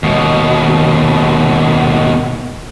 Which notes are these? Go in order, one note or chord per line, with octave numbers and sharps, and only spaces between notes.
D#2 B2